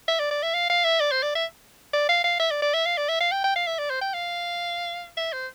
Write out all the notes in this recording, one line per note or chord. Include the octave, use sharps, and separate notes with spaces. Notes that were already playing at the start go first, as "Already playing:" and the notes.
E5
D5
D5
E5
F5
F5
E5
D5
C5
D5
E5
D5
F5
F5
E5
D5
D5
E5
F5
D5
E5
F5
G5
G5
F5
E5
D5
C5
G5
F5
E5
C5